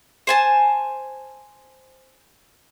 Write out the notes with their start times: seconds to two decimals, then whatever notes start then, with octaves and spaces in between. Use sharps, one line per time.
0.27 C5 G#5 A5